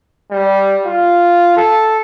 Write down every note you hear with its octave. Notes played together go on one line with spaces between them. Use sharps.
G3
F4
A4